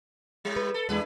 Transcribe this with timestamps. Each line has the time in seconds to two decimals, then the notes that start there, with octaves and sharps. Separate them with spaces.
0.45 A2 G3
0.56 B4
0.74 A4
0.89 E2 G#3 D4 E4 B4